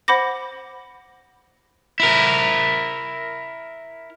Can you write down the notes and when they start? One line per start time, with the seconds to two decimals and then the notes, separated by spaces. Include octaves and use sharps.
0.08 C5 F#5 B5 D6 A#6
2.00 E4 A#4